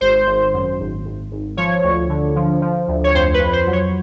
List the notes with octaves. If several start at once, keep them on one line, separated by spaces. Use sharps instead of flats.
G#1 C5
G#1
F#2
G#1
G#1
G#1
F3 C#5
D2
D3
F3
F3
D2
C#5
F2 C5
B4
F2
C5
F#3
C#5